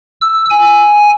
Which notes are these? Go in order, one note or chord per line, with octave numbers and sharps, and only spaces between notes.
E6
G#5